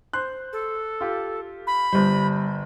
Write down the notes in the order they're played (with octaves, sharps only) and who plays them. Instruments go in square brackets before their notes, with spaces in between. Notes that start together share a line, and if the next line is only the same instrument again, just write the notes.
[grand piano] C5 C6 F#6
[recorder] A4
[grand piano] F4 G4
[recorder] B5
[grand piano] G1 C5 [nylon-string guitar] G3